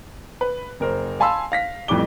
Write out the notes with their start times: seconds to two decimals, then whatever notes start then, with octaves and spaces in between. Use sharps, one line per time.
0.41 B4
0.80 F#1 A#4 C5
1.20 F5 G#5 A5 B5 C6 E6
1.52 F5 A#6 B6
1.88 A1 F2 A2 G3 D6 G7